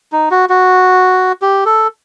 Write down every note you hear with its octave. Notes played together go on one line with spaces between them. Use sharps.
D#4
F#4
F#4
G4
A4